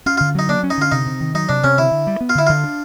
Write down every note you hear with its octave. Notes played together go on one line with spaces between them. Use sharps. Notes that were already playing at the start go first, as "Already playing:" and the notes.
C#4 F4
D3 F4
F#3 D#4
A#3 D4
C#4
D#4
D3 F4
C3 D#4
C3
D#3
F#3 D#4
C3 D4
C3 C#4
D3 E4
D3
G3
B3
F4
D3 E4
D3 F4
D4